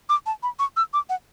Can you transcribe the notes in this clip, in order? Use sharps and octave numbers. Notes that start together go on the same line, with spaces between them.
D6
A5
B5
C#6
E6
D6
F#5